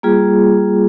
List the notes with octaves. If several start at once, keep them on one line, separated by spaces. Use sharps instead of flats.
G3 A#3 F4 G#4